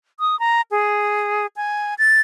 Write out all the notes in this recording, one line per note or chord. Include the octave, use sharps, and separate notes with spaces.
D#6
A#5
G#4
G#5
A6